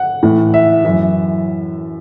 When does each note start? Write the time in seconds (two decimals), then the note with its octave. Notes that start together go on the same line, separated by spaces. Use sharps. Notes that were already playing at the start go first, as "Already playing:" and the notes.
Already playing: F#5
0.23 A2 E3
0.54 E5
0.85 F#2 E3 E5